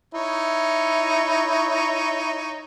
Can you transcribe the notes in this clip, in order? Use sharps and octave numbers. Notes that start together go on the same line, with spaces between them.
D#4 E4 C#5